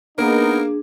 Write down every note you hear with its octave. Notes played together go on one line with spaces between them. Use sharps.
A#3 B3 D4 D#4 G#4 A#4